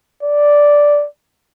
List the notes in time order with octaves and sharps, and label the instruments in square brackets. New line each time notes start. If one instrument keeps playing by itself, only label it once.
[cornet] D5